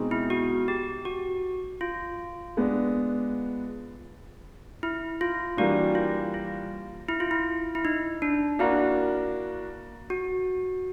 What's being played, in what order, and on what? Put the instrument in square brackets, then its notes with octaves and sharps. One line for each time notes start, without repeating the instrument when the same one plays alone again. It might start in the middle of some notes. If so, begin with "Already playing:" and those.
Already playing: [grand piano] B2 G#3 C4 D#4
[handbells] E4
F#4
G4
F#4
F4
[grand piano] G#3 B3 D4
[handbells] E4
F4
[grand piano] E3 G3 A#3 D4 [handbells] F#4
[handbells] F4
F4
E4
F4
E4
E4
D#4
D4
[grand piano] A#3 D4 F#4 A#4 [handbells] E4
[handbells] F#4